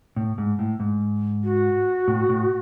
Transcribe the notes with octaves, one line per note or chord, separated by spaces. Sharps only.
A2
G#2
A2
G#2
F#4
A2
A2